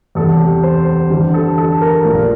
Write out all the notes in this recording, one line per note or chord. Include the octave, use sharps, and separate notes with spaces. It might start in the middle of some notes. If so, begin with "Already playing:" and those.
E2 C3 G3 A4
G4
C5
E2 D3 G3
A4
A4
A#4
A#1 A#2 F3